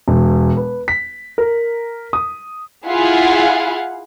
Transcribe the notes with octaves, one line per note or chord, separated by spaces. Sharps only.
E1
B4
B6
A#4
D#6
E4 F4 G#4 F5 F#5